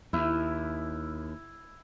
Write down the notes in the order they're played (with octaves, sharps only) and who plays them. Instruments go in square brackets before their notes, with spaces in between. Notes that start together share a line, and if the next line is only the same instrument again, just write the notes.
[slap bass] D#2 [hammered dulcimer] E4